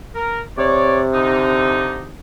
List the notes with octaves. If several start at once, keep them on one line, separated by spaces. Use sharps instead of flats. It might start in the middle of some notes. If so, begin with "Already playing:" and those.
A#4
C3 C#5 D5
D3 D#4